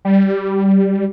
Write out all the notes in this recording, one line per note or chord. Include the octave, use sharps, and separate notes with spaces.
G3